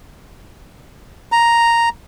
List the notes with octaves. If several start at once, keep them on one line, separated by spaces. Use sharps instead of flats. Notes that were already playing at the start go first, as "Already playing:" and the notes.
A#5